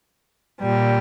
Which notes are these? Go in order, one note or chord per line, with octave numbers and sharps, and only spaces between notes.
A#2 G3